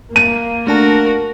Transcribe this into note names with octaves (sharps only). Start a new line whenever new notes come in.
A#3 D#7
A3 D4 F#4 A#4 A5